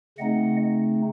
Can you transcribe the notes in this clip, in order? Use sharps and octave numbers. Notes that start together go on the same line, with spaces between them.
C#3 A3 C4 D#4 D#5 F#5